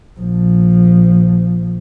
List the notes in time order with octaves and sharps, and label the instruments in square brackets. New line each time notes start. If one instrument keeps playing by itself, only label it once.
[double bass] A#1 F3